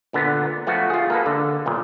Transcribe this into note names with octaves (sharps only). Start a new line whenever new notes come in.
A#2 D3 B3
F3 A3 B3 F#4
F4 G#4
A#3 A4 B4
D3
B1 A#2